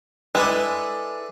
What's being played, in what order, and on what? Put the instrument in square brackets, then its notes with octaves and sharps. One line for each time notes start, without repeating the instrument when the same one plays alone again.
[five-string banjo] G#3 E4 [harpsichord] D4 A4 B4